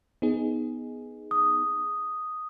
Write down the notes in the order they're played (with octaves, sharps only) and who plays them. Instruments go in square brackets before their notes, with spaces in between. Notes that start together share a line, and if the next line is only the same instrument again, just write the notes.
[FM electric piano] B3 D#4 G#4
[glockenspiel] D#6